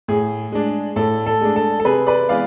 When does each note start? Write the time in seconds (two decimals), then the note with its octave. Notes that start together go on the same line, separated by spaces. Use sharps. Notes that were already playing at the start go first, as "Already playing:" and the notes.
0.08 A2 G#4
0.52 G#3 D4
0.96 A2 A4
1.26 A4
1.41 G#3 D4
1.56 A4
1.80 A4
1.85 C3 G#4 B4
2.07 B4 D5
2.29 E3 G#3 B3 D5 F5